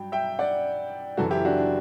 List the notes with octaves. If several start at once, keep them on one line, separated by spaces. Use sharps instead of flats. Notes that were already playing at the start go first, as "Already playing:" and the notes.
Already playing: G2 F#3 G5
E5 G5
D5 F#5
F#1 F#2 E3 F#4 A4
E4 G4
D4 F#4
D4